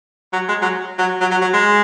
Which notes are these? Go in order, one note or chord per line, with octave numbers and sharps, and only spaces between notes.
F#3
G#3
F#3
F#3
F#3
F#3
F#3
G#3